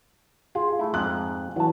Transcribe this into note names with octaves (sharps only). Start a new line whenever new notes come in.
F4 G#4
A3 E4
F2 G#2 F#6
E3 F#3 A5